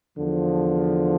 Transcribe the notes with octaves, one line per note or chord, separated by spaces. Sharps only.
E2 D3 F3